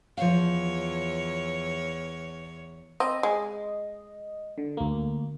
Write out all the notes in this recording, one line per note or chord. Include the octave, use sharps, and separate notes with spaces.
E2 F3 C#5 F5
C4 D#5
G#3
D3
D2 A#3